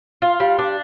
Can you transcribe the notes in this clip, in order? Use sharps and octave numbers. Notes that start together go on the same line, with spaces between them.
F4
G3
D4